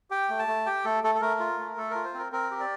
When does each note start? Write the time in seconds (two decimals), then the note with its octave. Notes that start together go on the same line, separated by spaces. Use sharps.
0.10 G4 G5
0.29 A3
0.39 A5
0.48 A3
0.66 G4 G5
0.84 A3 A4
1.03 A3 A4
1.15 A4
1.21 A3 A#4
1.40 F4
1.58 A3
1.77 A3 A4
1.91 F4 A#4
2.04 C5
2.14 C4 A#4
2.32 C4 A#4
2.51 G4
2.60 D5